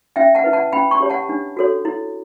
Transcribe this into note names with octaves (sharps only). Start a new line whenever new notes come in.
C#4 E5 G5
F#5 A5
E4 B4
F#5 A5
C#4 G5 B5
A5 C#6
G4 C#5
F#5 A5
D4
F#4 A4 C#5
E4